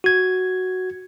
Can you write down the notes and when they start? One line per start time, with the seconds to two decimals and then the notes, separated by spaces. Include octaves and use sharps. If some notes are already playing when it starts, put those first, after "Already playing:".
0.04 F#4 G#6